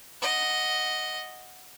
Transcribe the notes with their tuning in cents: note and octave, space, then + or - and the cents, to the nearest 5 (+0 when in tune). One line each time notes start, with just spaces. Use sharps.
D#5 +0 F#5 +0